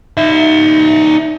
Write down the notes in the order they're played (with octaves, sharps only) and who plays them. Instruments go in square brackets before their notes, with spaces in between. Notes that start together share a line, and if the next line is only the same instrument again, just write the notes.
[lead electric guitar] D#4 E5